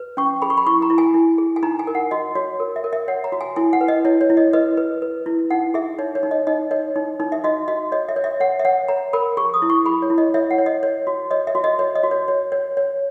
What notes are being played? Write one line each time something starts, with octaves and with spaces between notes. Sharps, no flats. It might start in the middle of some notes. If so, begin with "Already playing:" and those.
Already playing: B4
C#4 C#6
G#4 B5
C#6
B5
E4 C#6
A#5
E4
G#5
E4
G#4
G#5
D#4 A#5
G#5
A#4
F#5
F#4 D#5
F#4 C#5
A#4
E5
A#4
E5
C#5 F#5
A#5
F#4
G#5
E4 G#5
F#5
B4
D#5
E4 C#5
C#5
E4
D#5
B4 D#5
B4
B4
E4
D#4 F#5
G#4 E5
D#4 C#5
C#5
D#4
D#5
D#4 D#5
C#5 D#5
D#4
D#4
E5
F#4 D#5
F#4 D#5
C#5 D#5
E5
C#5
E5
C#5 F#5
E5
C#5 F#5
C#5 A#5
A#4 B5
G#4 C#6
D#6
E4
C#6
G#4 B5
C#5
E4
D#5
C#5 E5
F#5
C#5
D#5
C#5
F#4
C#5 D#5
E5
F#4
D#5
C#5
D#5
F#4
C#5
C#5
C#5
C#5